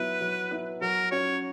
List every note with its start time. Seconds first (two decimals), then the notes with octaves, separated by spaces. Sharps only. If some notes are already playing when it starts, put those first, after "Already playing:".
Already playing: F#3 B3 E4 B4
0.21 F#3
0.51 B3 E4
0.81 F#3 A#4
1.11 C#4 F#4 C#5